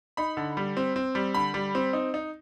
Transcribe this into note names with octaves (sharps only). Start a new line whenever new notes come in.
D#4 B5
D3
G3
C4
C4
G3
D3 B5
G3
C4
D#4
D#4